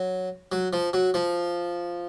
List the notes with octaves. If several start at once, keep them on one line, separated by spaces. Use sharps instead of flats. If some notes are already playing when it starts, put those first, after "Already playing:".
Already playing: F#3
F#3
F3
F#3
F3